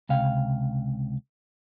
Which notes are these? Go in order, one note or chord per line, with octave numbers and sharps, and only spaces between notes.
C#2 C3 F5 G5